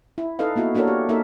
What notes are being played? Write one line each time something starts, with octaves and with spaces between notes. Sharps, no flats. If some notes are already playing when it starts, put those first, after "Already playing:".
E4
D#4 A4 B4 D#5 F5
A#3 B3 E4 F#4
A#3 D4 F#4 A4 A#4 C#5
G4
A#3 D#4 A4 A#4 E5